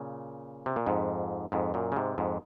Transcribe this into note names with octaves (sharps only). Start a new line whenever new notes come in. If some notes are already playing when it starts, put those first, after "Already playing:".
Already playing: A#2 C#3
C3
A#2
F2 G#2
F2 G#2
F#2 A#2
C#3
G#2 C3
F2 G#2